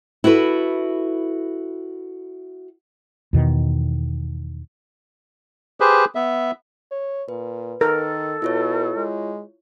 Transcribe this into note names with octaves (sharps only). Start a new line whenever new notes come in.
E4 F#4 A4 B4
E2 B2 D#3
G4 G#4 B4 C5
B3 E5
C#5
A#2 B4
D#3 A4 A#4
B2 E4 F4 C#5
G#3